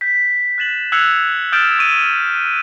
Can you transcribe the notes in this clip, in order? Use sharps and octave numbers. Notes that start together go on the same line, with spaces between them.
G6 B6
F#6 A6 E7 F#7
E6 F#6 G#6 C7 C#7 F7
D#6 F6 G6 A6 D7 E7
C#6 D7 D#7